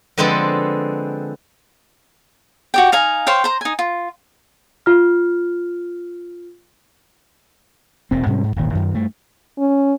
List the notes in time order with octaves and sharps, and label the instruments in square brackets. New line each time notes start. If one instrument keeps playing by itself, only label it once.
[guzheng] D3 F3 G#3 B3 C4 A4
[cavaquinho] F#4 G4 G5
D#4 F5 G#5 A#5
C5 C#5 F5 G5
C5 A#5
D#4 G#5
F4
[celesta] F4 F6
[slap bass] E1 A#2 C4
G#2 C3 G3 C#4
G#2
D#1 G#1 A#2 D#3
F#2 D#3
G2 A3
[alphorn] C#4